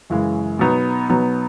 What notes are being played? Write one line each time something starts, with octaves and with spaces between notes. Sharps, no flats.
F#2 C#3 E3 G#3
B2 F#3 B3 D#4
B2 F#3 B3 D#4